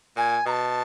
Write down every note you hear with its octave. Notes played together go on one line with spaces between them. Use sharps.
A#2 G#5
B2 A5 A#5